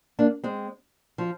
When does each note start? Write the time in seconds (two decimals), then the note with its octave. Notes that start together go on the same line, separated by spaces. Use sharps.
0.19 A#3 D4
0.44 G#3 C4
1.18 F3